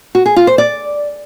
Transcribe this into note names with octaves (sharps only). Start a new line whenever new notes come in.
F#4
G#4
F4
C5
D5